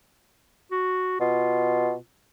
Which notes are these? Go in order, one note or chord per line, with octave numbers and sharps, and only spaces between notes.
F#4
B2 F4